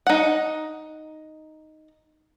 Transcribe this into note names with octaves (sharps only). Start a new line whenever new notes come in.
D#4 F#5